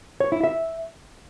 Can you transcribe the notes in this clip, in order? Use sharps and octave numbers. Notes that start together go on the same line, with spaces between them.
C#5
E4
E5